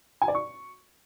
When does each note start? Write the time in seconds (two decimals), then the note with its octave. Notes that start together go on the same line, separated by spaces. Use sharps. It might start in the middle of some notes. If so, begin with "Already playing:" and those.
0.22 G#5
0.28 D5
0.35 C#6